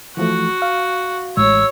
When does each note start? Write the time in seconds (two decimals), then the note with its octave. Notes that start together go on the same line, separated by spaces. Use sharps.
0.17 E3 F3 A3 F#4
0.62 F5
1.37 A1 A2 G#3 C#5 E6